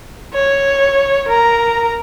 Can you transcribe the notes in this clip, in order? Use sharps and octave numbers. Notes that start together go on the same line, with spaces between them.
C#5
A#4 A#5